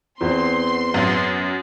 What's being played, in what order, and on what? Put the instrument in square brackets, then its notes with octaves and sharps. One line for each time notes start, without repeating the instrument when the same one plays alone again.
[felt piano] E2 C4 [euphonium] B3 [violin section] C6
[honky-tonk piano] F#2 F#3